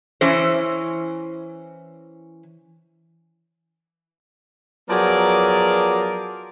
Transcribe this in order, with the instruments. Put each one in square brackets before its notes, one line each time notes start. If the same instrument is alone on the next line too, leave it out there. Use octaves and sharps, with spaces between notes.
[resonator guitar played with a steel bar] E3 C#4 C5
[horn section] F3 F#3 B3 G#4 A#4 D5